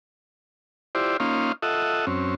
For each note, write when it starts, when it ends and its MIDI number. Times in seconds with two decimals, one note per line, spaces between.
0.95 1.17 64
0.95 1.17 65
0.95 1.17 67
0.95 1.17 72
0.95 1.17 74
1.20 1.52 58
1.20 1.52 61
1.20 1.52 63
1.20 1.52 65
1.20 1.52 77
1.20 1.52 84
1.62 2.06 65
1.62 2.06 69
1.62 2.06 75
1.62 2.06 76
1.62 2.06 78
2.07 2.35 42
2.07 2.35 60
2.07 2.35 61